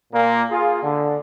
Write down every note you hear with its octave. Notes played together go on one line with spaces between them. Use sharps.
A#2 A#3
F4 G#4
D3